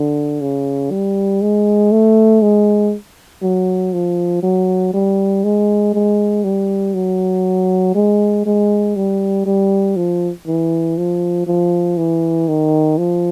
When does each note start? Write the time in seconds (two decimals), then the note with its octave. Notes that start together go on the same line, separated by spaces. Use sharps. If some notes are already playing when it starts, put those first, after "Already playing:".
Already playing: D3
0.41 C#3
0.91 G3
1.42 G#3
1.92 A3
2.42 G#3
3.43 F#3
3.93 F3
4.43 F#3
4.94 G3
5.44 G#3
5.94 G#3
6.44 G3
6.94 F#3
7.95 G#3
8.46 G#3
8.96 G3
9.46 G3
9.97 F3
10.47 E3
10.97 F3
11.47 F3
11.97 E3
12.48 D#3
12.98 F3